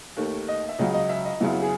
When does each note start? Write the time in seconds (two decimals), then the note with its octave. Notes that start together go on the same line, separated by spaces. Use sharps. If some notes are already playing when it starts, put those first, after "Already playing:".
0.17 D#2 D#3 A3
0.48 D#5
0.69 E5
0.79 C#2 C#3 F#3 D#5
0.94 D#5
1.09 E5
1.25 D#5
1.40 F#2 C#3 F#3 B3 E4
1.62 G#4